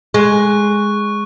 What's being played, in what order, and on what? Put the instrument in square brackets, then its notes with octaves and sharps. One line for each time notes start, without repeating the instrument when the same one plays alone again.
[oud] G#3 [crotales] C#6 F#6